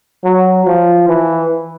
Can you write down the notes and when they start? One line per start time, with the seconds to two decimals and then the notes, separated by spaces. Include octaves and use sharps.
0.24 F#3
0.66 F3
1.08 E3